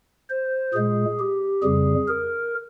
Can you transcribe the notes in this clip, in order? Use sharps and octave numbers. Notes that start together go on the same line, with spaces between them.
C5
A#2 G#3 G#4
G4
F2 C#3 G3 G#4
A#4